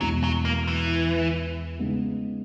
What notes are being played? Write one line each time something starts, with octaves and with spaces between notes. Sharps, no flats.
E2 B2 F#3 G#3 B3 E4
F#3
A#3
E3
C#3 G#3 B3 D#4